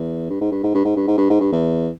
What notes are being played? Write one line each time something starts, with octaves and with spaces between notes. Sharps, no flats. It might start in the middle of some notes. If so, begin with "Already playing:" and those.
Already playing: E2
G2
G#2
G2
G#2
G2
G#2
G2
G#2
G2
G#2
G2
E2